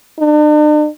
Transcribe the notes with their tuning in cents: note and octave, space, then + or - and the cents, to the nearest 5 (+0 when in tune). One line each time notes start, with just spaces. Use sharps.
D4 +45